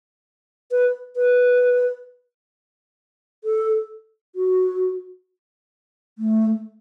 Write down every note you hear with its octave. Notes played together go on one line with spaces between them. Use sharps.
B4
B4
A4
F#4
A3